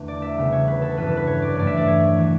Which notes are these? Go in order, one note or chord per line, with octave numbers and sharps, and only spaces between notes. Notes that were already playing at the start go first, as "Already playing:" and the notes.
Already playing: E2 D3 A3
D5
E5
C#2 C#3 G3 B3
C#5
B4
A4
G2 E3 G3 B3 B4
A4
B4
C#5
D5
G2 E3 A3 D5
E5
D5
C#5
E3 G3 B3